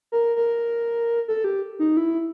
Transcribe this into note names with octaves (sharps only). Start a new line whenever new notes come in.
A#4
A#4
A4
G4
D#4
E4